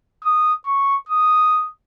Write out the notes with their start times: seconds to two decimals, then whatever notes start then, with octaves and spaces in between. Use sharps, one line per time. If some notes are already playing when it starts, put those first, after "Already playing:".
0.23 D#6
0.66 C#6
1.09 D#6